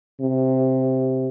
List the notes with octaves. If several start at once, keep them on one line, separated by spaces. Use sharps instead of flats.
C3